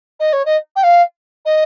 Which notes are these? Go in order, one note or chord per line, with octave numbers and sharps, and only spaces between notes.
D#5
C#5
D#5
G5
F5
D#5